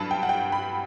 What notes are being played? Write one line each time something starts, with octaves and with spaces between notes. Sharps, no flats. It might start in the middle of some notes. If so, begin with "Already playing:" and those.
Already playing: G2 F#3 A5 B5
G5
F#5
G5
B5